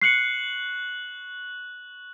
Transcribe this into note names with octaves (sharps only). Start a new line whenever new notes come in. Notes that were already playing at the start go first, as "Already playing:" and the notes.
C#6 F#6 C7 C#7 F#7